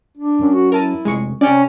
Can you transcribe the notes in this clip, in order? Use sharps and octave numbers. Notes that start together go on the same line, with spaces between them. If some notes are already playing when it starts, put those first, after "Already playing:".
D4
F#2
F#4
E4 A#4 A5 D#7
F1 G#3 C#6
C3 C#4 D5 G5